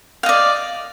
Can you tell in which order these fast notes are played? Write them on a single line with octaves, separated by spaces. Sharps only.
F5 D#5 D5